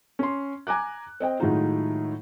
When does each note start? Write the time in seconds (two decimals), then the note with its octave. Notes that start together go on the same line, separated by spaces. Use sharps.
0.19 C#4 C6
0.67 G#5 A#5 D6 F#6
1.20 C4 D#5 G5
1.39 A2 D#3 F#3 G#3 D#4 F4